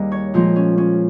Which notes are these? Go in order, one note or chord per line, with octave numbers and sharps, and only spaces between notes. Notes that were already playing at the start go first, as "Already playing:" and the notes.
Already playing: D#2 D#3 G3 G#4 A#4
C#5
A#2 F3 G#3
C#4
C#4